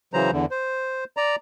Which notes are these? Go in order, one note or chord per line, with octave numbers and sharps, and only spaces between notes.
C#3 E3 F#3 C5 A#5
E2 D3
C5
D5 A#5